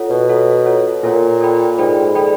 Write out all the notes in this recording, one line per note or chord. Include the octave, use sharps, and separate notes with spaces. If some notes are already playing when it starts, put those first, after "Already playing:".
Already playing: F4 A4 C#5 F#5
B2
F4 A4 C#5 F#5
F4 A4 C#5 F#5
A#2 F4 A4 C#5 F#5
A4 D5 G5 B5
G#2 A4 D5 G5 B5
A4 D5 G5 B5